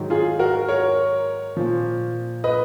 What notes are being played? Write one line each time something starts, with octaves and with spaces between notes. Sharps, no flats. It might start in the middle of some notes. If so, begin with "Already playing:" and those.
Already playing: G#2 D#3 F#3
F4 G#4
F#4 A#4
A#4 C#5
A#2 F3
B4 D#5